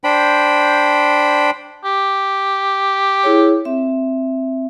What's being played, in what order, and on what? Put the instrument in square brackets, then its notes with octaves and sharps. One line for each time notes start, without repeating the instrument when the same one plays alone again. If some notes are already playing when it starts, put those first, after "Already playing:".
[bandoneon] D4 C5 G5 B5
[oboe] G4
[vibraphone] E4 G#4 C#5
C4 E5